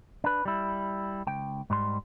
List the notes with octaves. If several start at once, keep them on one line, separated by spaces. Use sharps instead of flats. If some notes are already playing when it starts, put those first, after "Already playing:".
D4 B4
G3 E4
C#2 G5
G#2 G3 C6